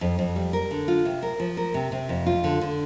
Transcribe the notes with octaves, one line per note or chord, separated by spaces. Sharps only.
F2
F2
G3
A#4
D3
F4
C3
A#4
F3
A#4
C3
C3
F2
F4
D3
D3